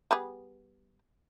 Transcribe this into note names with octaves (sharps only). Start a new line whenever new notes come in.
G3 B3 G#4